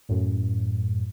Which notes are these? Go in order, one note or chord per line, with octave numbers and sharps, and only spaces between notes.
F#2 A2